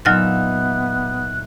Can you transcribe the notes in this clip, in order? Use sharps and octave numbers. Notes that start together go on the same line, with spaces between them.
A#2 F#3 B3 D#4 E5 F6 F#6 A6